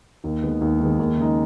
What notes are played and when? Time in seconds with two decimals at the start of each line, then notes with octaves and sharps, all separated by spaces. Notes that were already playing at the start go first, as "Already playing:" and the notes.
0.24 D#2
0.43 D#3 G#3 B3
0.61 D#2
0.80 D#3 G#3 B3
0.99 D#2
1.17 C#3 G#3 D#4